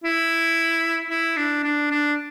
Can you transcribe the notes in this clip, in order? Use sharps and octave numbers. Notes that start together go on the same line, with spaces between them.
E4
E4
D4
D4
D4